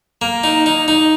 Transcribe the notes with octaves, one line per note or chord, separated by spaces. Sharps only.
A#3
D#4
D#4
D#4